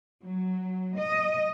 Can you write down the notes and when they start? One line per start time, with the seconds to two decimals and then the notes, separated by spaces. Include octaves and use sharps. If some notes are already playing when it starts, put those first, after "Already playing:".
0.25 F#3
0.98 D#5